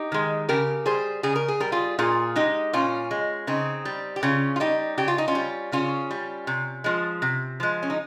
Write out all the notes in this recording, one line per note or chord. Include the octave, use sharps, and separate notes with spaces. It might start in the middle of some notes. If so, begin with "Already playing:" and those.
Already playing: D#4 G4
D#3 G#3
C#3 G4 A#4
G3 G#4 C5
C#3 G#4
A#4
G#4
G3 A#4
F4 G#4
A#2 F4 G#4
G#3 D#4 G4
A#2 C#4 F4
G#3
C#3 C4 D#4
G3
G4
C#3 C#4 F4
F4
G3 D#4 G4
C#3 G4
F4
D#4
C#4 F4
G3
C#3 C#4 F4
G3
C3
F3 G#3
C3
F3 G#3
C#4
D#4